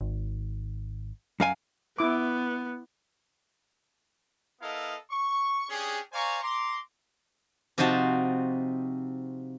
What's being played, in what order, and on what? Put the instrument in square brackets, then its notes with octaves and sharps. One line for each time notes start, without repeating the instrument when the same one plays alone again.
[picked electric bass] G#1
[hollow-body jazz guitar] F#2 F5 G#5
[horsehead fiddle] B3 [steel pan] E4 D6
[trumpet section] B3 E4 A4 A#4 D#5 F5
C#6
C#4 D4 G4 G#4
C5 D5 F5 G#5 A#5 C#6
A#5 C6 D6
[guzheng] C3 F3 C4 D#4 F#4 A5